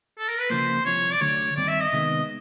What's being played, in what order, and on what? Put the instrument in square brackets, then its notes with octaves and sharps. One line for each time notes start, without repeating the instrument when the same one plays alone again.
[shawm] A4
A#4
B4
[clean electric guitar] C#2 C#3 F3 A#3 [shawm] C5
[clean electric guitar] C2 C3 F3 [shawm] C#5
[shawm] D5
[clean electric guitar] D2 D3 F#3 A3 [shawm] C#5
[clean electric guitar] G2 D#3 G3 C4 [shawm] D5
[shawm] E5
D#5
[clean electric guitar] C3 D#3 G#3 B3